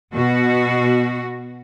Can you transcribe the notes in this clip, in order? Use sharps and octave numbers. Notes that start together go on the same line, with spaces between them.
B2 F#4